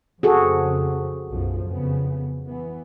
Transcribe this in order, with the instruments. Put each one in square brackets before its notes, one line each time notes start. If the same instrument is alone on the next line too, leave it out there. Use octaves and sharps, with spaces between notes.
[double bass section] F2 C#3 C4 [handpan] F#4 G#4 A4
[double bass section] B1 F#2 F3
F2 C#3 B3
E3 B3